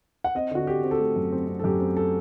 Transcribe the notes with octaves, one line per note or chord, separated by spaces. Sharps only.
F#5
C4 D#5
D3 F#4
C4 G4
C4
A4
A3 G4
F#2
C4
C4
A4
F#2 G4
C4
A4